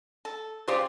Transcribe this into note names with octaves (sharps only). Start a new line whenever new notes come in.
A4
C#3 F4 G4 C5 D5